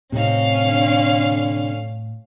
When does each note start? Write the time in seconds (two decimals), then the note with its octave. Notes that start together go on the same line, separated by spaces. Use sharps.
0.12 A2 C3 C4 C#4 D#4 F5
0.61 D3